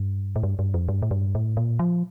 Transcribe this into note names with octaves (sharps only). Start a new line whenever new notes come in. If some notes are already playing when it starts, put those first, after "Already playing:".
Already playing: G2
A2
G2
G2
F2
G2
A2
G2
A2
A#2
F3